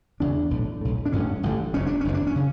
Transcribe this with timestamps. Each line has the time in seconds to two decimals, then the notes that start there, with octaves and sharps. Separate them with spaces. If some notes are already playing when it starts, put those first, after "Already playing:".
0.20 E1 E2 C#3 D4
0.51 B1 A2
0.81 B1 A2
1.06 D4
1.11 A1 G2 D3 C#4
1.43 A1 G2 D3
1.74 F#1 F#2 C#3 C#4
1.86 D4
2.01 C#4
2.05 F#1 F#2 C#3
2.14 D4
2.27 C#4
2.36 C#3